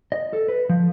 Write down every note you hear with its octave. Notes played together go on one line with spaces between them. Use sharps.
D#5
A4
B4
F3